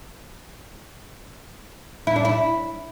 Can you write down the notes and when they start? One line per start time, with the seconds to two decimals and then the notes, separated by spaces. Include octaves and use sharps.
2.07 E4
2.16 D4
2.25 E4